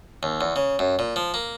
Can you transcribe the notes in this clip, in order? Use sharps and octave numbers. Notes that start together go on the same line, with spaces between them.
D#2
E2
C#3
F#2
A#2
F3
A#3